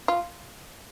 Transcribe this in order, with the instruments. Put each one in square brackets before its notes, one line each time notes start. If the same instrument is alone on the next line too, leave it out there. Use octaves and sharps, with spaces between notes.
[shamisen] F4